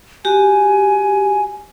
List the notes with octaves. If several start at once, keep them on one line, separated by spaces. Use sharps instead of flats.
F#4 G4 G#5